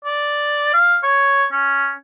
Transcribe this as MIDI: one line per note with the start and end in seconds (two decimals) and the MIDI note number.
0.05 0.69 74
0.74 0.98 77
1.03 1.45 73
1.52 1.93 61